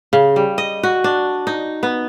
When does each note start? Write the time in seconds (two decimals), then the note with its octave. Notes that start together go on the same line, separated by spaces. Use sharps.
0.13 C#3
0.36 G3
0.58 D#5
0.83 F#4
1.04 D4
1.47 D#4
1.83 B3